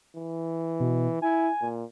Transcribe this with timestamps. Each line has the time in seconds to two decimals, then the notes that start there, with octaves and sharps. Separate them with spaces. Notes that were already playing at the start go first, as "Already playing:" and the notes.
0.17 E3
0.80 B2
1.22 E4 G#5
1.61 A#2